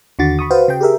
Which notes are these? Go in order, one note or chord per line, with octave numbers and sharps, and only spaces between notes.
D#2 D3 F#4 A6
B5 C#6 D#6
F#4 B4 C5 F5
C#3 G5
G4 G#4 A#4 E5